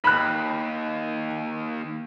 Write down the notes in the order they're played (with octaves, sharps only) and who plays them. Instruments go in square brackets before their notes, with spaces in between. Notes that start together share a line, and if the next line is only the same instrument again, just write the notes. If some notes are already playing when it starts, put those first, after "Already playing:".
[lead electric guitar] D#2 [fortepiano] B5 F#6